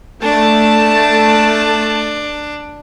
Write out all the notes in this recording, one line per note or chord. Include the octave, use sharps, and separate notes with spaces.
A3 D4 A5